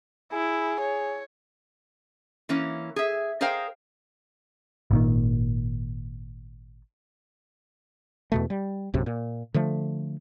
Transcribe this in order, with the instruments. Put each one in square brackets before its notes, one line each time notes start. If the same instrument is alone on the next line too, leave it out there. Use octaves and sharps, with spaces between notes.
[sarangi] E4 [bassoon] G#4
[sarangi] C#5
[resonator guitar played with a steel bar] E3 A#3 C#4
G#4 E5
G#4 A#4 C5 D#5 F5 G5
[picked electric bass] G#1 A#2 D#3
[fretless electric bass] E2 B2 A3
G3
A#1 F#2 C3
A#2
D3 F3 A3